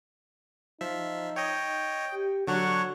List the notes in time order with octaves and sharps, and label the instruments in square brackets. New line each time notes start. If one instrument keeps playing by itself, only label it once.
[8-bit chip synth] F3 E5 [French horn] D#4
[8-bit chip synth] C#5 D#5 [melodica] G5
[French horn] G4
[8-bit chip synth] D3 F#3 D4 [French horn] F#4 [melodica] C#5 F#5 C#6